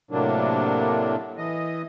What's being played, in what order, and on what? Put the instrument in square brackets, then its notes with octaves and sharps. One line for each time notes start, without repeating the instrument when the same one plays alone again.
[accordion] A2 C3 F#3 A#3 D4
E3 D#5